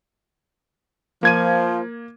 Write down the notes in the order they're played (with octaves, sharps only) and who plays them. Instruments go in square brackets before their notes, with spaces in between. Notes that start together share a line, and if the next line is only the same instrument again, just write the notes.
[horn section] F3 [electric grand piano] A#3 G#6 D#7